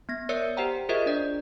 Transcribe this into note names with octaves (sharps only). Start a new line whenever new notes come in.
B3 A#6
A#4 C#5 D5 E5 E6 C#7
G4 C5 F#5 G5 A#5
F4 G#4 A#4 C5 D#5 E5
D4 D5